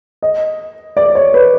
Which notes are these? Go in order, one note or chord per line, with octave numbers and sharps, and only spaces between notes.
D#5
D5
D5
C#5
B4